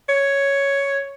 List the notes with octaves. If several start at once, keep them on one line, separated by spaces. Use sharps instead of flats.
C#5